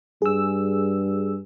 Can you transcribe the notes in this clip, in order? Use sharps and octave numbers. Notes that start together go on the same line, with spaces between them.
G2 G#4 E6